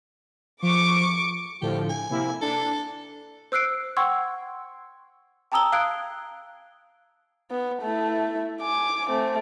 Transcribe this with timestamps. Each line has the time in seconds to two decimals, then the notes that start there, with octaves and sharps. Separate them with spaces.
0.63 F3 C#6 D6
1.61 A2 D3 F3 G4
1.89 G#5
2.09 C3 A#3 E4
2.42 D4 A4
3.52 C5 E6 F#6 C7 D7
3.97 F#5 G5 C6 C#6 E6 G#6
5.52 G5 A5 A#5 D#6 E6 G7
5.72 F5 D#6 F#6 G#6 D7
7.51 B3
7.83 A3 E4
8.62 G#5 D6
9.10 A3 C4